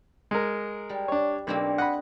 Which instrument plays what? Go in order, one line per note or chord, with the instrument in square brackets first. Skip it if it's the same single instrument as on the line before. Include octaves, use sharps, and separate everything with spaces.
[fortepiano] G#3 A#4
[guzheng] G3
[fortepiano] D4 C#5
[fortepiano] B1 [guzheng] A#3 C4 D4
[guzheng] D#5 [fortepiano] F#5 B5